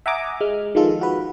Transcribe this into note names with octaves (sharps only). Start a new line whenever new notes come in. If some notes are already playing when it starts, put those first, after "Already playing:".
E5 F#5 G#5 A#5 D6 D#6
G#3 F6
D#3 F3 G#3 F4 A4
F#4 B4